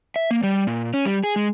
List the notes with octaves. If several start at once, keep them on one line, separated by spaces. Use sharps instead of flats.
E5
A#3
G3
A#2
C#4
G3
G#4
G#3